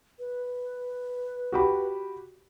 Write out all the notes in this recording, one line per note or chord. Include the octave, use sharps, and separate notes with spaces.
B4
F#4 G4 B5